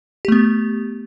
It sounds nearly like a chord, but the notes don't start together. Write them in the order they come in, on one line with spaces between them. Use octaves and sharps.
G4 A3 B3